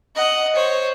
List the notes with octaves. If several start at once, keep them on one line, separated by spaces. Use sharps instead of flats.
D#5 F#5
C5 C#5